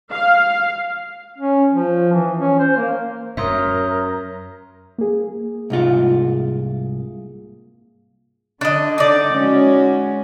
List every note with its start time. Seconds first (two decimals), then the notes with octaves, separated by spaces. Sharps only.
0.12 F5
1.38 C#4
1.71 F3
2.12 E3
2.37 C#4
2.59 C5
2.76 A#3
3.37 F#2 A#4 C#5 E5 A#5 C6 D#6
4.98 A#3 G#4
5.70 C2 G#2 F4
8.61 D3 D4 D#5
8.98 D#4 D5
9.34 G#3 C#4 F#4